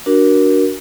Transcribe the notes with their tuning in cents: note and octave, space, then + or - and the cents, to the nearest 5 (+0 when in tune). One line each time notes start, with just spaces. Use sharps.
D4 -5 F#4 +5 A#4 +15